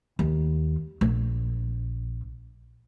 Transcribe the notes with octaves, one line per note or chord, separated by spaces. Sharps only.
D#2
A#1